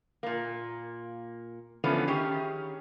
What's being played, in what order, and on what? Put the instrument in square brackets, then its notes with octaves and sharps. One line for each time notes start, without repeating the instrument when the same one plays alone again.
[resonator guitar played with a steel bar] A#2 A#3
D3 E3 F3 A3 B3 C#4
D#3 C#4 G4 G#4